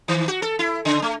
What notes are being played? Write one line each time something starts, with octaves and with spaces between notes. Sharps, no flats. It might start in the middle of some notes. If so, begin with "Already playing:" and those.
D#3
F#4
A4
E4
C#3
A3